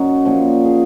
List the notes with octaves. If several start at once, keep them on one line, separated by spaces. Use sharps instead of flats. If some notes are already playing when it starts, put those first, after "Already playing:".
Already playing: F#2 C#4 D#4 F#4
A#2 F3
G#4